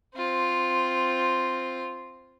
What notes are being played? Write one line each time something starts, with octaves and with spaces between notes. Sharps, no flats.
C4 F4